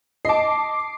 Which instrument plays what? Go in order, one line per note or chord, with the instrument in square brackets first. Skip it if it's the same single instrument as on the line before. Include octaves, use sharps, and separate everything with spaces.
[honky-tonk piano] D#5 A5 [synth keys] D6 C7